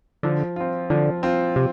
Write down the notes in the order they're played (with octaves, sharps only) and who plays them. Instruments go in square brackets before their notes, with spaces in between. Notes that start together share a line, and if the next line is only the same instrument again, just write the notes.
[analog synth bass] D3 [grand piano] F3
[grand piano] C4 F4
[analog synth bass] D3 [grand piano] F3
[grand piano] C4 F4
[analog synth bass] C3